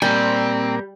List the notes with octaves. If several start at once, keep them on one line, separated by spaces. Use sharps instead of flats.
A#2 G3 A#3 C4 G#5